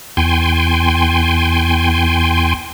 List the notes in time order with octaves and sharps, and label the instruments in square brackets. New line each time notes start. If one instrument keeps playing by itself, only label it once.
[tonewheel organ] E2 G5 G#5 C6